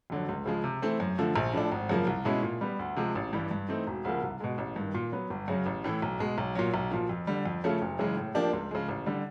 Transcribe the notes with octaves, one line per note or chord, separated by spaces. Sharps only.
F2 D3 F#3
C#2
C#3 F3 G#3
C3
E3 A3 C4
F#2
D3 F3 A3
A#1
A2 F3 A3 D4
G#1
F#2 C#3 F3 A#3
C2
B2 G#3 C#4 E4
A#2
G3 B3
D2
C3 F3 G#3
A1
G2 E3 G3
G2
E3 A3 C4 D#4
E1
D2 C#3 F3 A#3
C2
B2 G#3
A1
G2 D#3
A#2
F#3 B3
G1
F#2 C#3 F#3
A1
A2 E3 A3
B1
B2 G#3
B1
A#2 F#3
B1
A#2 F3
F2
D3 G3
F2
C#3 F3 A3 C#4
F#1
F#2 C#3 E3 G#3
A2
F3 A#3 D4 G4
C#2
C#3 F3 G#3
A1
D3 G3